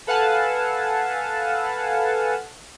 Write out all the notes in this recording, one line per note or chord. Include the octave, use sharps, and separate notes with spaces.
A4 B4 F5 F#5 G#5 A5